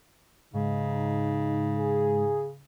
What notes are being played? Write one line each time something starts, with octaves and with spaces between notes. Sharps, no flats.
G#2 C#3 D#4
G#4